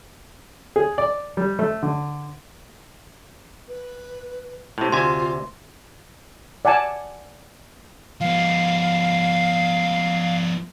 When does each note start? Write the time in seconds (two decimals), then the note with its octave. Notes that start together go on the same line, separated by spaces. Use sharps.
0.76 G#4
0.98 D5
1.37 G3
1.59 A3
1.83 D3
3.69 B4
4.78 A2 C3
4.92 D2 C3 F4 G#5 C6
6.65 D5 F#5 G#5 A5
8.21 F3 B3 F5